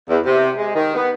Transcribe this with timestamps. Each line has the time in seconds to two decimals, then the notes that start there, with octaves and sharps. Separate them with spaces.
0.09 E2
0.25 C3
0.58 G#3
0.75 D#3
0.95 B3